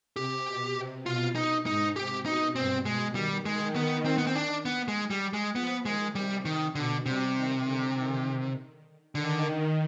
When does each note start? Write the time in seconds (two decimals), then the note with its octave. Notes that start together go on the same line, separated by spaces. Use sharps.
0.16 C3 G4
0.47 B2
0.76 C3
1.06 B2 F4
1.35 D#4
1.66 G#2 D#4
1.96 C3 G4
2.26 B2 D#4
2.56 G2 C4
2.85 B2 G#3
3.15 D#3 G3
3.46 D#3 G#3
3.76 B3
4.05 C4
4.18 B3
4.27 C4
4.36 D4
4.65 B3
4.88 G#3
5.10 G3
5.33 G#3
5.55 F3 B3
5.85 D#3 G#3
6.15 C3 G3
6.45 D#3
6.75 B2 D3
7.05 C3 G3
7.35 D#3
7.65 D3
7.94 D#3
9.15 D3 D#3